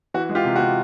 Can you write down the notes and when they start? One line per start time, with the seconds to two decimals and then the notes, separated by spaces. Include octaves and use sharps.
0.14 E3 F#4
0.29 G#3
0.35 F4 G4
0.45 C3
0.56 F#4
0.61 C3